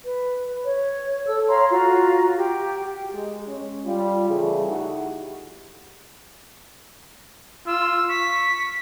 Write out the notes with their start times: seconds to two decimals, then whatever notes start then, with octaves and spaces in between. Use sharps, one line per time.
0.05 B4
0.63 C#5
1.26 A4 E6
1.48 C#5 F5 A#5 C6
1.71 F4 F#4 F5 A#5
2.35 G4 G5
3.14 G#3
3.48 C#4
3.85 G3 F4
4.29 C#3 E3 A3 G#4
4.68 A3 D#4 E4 F#4 G4
7.66 F4 E6
8.09 C#6 B6